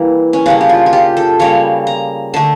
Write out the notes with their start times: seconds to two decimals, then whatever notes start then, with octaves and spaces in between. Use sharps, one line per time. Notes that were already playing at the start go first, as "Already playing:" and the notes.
Already playing: E3 G3 A#3 E4
0.33 C#4
0.46 C#3 G3 A#3 D4
0.61 G4
0.69 F4
0.86 F4
0.93 G4
1.17 A4
1.39 C#3 G3 A#3 C#5
1.87 A#5
2.34 D3 A3 A5